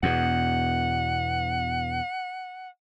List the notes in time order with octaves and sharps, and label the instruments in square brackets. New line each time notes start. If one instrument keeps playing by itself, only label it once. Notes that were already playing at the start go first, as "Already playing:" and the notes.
[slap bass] E2 B2 [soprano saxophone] F#5